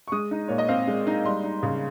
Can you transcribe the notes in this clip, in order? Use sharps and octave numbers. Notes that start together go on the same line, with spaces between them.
C#6
G#3 D#6
D#4
A#2 C#5
D#5
C4 F5
G#3
D#4
G3 C6
D#4
C#3